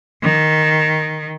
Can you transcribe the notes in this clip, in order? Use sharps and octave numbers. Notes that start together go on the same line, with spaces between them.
D#3